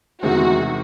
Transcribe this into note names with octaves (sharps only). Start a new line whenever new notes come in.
E2 C3 D#3 G#3 C4 F#4